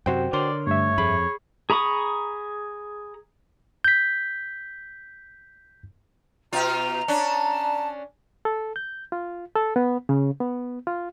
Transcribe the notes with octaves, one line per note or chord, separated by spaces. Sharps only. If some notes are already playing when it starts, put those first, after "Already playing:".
F#2 C3 F#4 C5 G5
D3 A#4 C#5 D5 C6
G2 A3 C#5 E5
F2 G#4 B5
G#4 A#5 B5 C#6 D#6
G6 B6
B2 F4 A#5
C#4 D4 A5
A4
G6
F4
A4
B3
C#3
B3
F4